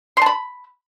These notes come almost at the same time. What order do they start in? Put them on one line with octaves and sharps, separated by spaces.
C6 A5 B5